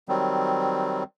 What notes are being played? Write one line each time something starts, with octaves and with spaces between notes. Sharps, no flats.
D#3 F#3 G3 C4